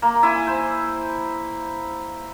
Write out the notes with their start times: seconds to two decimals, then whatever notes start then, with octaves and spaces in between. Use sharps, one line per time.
0.02 A#3
0.23 E4 G#5
0.47 C5